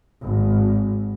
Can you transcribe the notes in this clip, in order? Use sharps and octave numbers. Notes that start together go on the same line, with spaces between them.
G#1